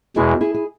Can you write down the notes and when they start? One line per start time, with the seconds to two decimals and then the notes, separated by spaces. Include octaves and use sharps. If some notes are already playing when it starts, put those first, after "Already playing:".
0.16 E2 B2 G#3 E4 G#4
0.41 E4 G#4
0.54 G#4